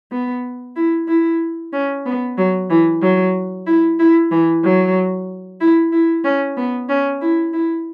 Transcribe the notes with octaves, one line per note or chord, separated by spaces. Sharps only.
B3
E4
E4
C#4
B3
F#3
E3
F#3
E4
E4
E3
F#3
E4
E4
C#4
B3
C#4
E4
E4